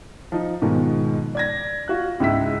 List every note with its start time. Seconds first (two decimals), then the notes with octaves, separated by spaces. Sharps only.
0.32 F3 D#4
0.62 G#2 B2 D#3 F3 G#3
1.35 D5 G#6 A#6
1.88 F4 F#4 F#6
2.20 C#2 G#2 E4 E6 B6